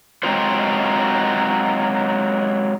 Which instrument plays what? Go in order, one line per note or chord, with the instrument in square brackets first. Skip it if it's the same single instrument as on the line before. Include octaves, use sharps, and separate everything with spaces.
[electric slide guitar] F#3 G#3 C4 D#4 F4 C5